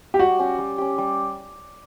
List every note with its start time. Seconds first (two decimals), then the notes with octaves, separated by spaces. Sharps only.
0.14 G4
0.19 G3 F#4
0.39 C#4 G4
0.59 G3
0.78 C#4 G4
0.98 G3